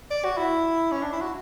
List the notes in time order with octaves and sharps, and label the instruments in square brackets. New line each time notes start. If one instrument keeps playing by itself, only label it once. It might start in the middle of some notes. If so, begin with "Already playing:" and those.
[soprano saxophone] D5
F#4
E4
C#4
D4
E4
F#4